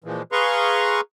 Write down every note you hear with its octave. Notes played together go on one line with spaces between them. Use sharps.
A#2 E3 F3 G#3
G#4 B4 F5 A#5 C6 C#6